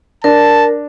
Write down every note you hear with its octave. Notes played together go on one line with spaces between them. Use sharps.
D4 A#4 A5